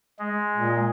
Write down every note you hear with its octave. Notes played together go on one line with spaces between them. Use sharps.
G#3
A#2